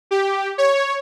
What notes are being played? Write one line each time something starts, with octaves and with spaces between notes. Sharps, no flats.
G4
C#5